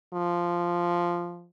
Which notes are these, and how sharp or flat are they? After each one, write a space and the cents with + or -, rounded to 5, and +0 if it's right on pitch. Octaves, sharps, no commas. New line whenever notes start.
F3 -5